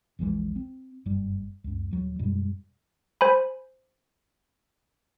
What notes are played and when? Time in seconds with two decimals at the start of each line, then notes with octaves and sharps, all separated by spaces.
0.19 A#1 E2 E3 G#3
0.56 C4
1.06 F#1 G2 G3
1.64 C#2 F#2
1.91 D#1 F#3
2.19 F#2 B2 G3 G#3
3.21 C5 G#5 B5